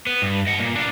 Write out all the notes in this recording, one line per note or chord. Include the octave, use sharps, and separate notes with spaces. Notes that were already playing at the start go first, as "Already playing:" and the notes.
B3
G2
D#5 F#5
A#2
D4 F4